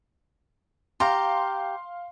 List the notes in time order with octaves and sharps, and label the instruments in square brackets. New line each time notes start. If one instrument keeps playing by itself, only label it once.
[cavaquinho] G4 A#5 [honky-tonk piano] F5 C6